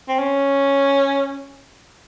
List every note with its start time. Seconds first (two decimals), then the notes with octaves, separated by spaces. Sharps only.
0.08 C4
0.19 C#4